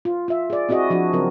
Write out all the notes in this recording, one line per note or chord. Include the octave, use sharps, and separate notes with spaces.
F4
F4 E5
G#4 D5
C4 E4 F#4 G#4 D#5
F3 D4 F#4
C#3 F#3 C4 A#4